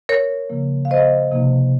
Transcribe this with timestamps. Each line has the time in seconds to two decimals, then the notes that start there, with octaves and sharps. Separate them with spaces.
0.09 A#4 C#5
0.50 C#3 F3 A#3
0.85 F5
0.91 C5 D#5
1.31 C3 F3 A#3 D#4